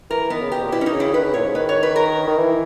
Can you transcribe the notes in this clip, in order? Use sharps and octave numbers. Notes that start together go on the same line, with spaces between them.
E3 A#4
D#3 B3
C#3
B2 G4
A#2
B2 E4
C#4
D#4
C#3
E4
D#3 B4
C#3
A#2 C#5
G#2
D#3 B4
C#5
B4
A#4
D#3
E3